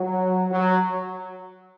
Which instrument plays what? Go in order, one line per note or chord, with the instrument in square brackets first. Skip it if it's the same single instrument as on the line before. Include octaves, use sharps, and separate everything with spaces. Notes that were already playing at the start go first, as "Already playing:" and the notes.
Already playing: [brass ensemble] F#3
F#3